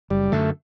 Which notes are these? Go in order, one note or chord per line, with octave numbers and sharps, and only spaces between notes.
F#1 G3
F#2 D3 A3